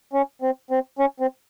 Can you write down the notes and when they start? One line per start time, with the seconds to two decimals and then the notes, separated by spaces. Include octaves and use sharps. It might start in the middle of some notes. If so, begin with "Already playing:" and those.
0.13 C#4
0.42 C4
0.71 C4
0.99 C#4
1.20 C4